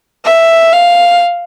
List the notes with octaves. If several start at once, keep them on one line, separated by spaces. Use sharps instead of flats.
E5
F5